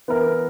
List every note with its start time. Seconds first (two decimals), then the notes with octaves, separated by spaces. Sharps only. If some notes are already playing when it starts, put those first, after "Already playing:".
0.08 E3 B3 E4 A#4